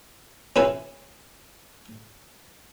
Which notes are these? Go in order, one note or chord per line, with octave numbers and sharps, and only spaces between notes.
C#4 E4 B4 G#5